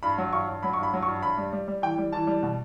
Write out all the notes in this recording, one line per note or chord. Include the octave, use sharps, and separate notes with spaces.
G2 B5
F#3
G2 C#6
G2
F#3 B5
C#6
G2 B5
F#3
C#6
G2
G2 B5
G3
G3
G3
E3 G5
G3
E3 A5
G3
B2